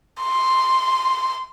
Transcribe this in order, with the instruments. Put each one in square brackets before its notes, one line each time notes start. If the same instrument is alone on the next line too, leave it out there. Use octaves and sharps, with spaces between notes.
[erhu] C6